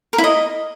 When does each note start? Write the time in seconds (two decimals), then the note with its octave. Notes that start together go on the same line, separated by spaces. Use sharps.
0.13 A#4
0.18 E4
0.24 D#5